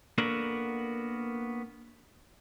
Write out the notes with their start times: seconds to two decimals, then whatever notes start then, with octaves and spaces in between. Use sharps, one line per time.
0.18 A#3 B3 D4 F#4 A4 A#4